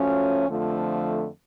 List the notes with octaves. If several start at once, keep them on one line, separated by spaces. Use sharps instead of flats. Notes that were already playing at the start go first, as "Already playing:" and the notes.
Already playing: F3 A3 C#4 F#4
F2 D3 F3 A3